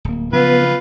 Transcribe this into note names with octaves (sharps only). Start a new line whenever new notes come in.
D1 A#3
C#3 F3 F#3 B3 F4 B4